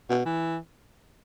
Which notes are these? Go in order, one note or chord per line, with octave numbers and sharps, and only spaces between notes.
B2
E3